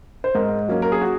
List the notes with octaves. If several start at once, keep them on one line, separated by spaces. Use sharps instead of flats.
C5
G#2 A#4
F#3 A#3 C#4
A#4
G#4
F#4